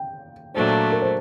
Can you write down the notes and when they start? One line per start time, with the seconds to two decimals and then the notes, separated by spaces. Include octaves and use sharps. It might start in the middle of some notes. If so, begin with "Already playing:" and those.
Already playing: G5
0.54 A#2 F#3 A3 D4 C5
0.92 A#4
1.02 C5